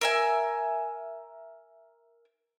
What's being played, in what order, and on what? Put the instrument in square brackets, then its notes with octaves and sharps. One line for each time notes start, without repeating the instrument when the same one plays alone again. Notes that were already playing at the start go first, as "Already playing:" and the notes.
[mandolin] A#4 E5 G#5